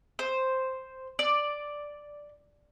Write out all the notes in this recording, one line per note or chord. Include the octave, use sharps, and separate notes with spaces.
C5
D5